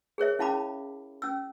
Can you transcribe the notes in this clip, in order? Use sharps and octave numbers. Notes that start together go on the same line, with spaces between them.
G#4 A#4 C#5 E5
C#4 E4 F5 A5 B5 D6
C#4 E6